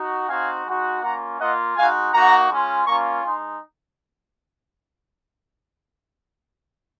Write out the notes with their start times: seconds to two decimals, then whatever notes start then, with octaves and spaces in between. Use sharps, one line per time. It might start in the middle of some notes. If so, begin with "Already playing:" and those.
Already playing: D#4 F#4
0.29 C4 D#4 F#4 F5 G#5
0.66 G#3 D#4 F#4
1.02 A#3 C#4 F4 F#5 A#5
1.40 A#3 F4 D#5 F#5
1.76 G#3 D#4 F#4 F5 G#5
2.13 A#3 D#4 F#4 F#5 A#5
2.50 G#3 C#4 F4
2.87 A#3 C#4 F4 A#5 C#6
3.24 G#3 D#4 G#5 C6